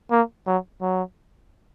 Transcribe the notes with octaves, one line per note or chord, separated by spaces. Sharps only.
A#3
F#3
F#3